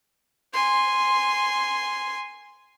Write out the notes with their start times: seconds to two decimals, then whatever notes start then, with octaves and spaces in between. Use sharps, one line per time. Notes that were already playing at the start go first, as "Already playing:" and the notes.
0.54 G#5 C6